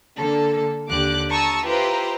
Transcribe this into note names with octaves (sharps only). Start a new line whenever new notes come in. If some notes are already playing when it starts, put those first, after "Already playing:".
D3 A#3 A4
D#2 D3 G4 D6 F#6
A5 A#5 C#6 D#6 E6
E4 F4 G4 B4 C5 A#5